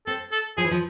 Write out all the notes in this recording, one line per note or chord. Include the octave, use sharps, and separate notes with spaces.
C4 A4
A4
F3 G#4
E3
F3